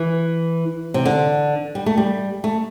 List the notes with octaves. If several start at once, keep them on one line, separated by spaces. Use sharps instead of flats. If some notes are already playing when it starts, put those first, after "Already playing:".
Already playing: E3
C3
D3
G3
A3
G3
A3